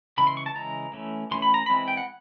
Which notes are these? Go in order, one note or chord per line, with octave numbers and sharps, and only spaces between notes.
C#3 E3 G#3 B5
C6
C#6
A5
C#3 E3 G#3 A#5
E3 A3 C#4
E3 A3 C#4 C6
B5
A#5
E3 G#3 C4 B5
G5
F#5